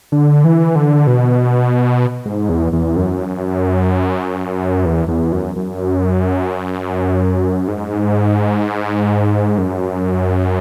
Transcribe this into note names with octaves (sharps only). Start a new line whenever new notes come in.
D3
E3
D3
B2
G#2
E2
E2
F#2
E2
E2
F#2
F#2
G#2
F#2